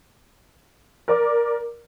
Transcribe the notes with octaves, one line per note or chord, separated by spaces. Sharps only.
A#4 D5 D6